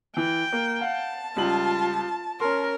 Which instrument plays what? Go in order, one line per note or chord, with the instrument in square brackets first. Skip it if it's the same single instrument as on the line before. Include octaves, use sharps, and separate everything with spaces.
[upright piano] E3 [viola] G5
[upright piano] A#3
[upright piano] F5 F#5 [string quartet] A5
[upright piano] C#2 G3 F#7 [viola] F4
[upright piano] C#4 C6 [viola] A#4